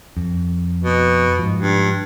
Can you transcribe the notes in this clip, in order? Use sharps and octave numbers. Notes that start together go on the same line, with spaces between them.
F2
B2
G#2 F3
G2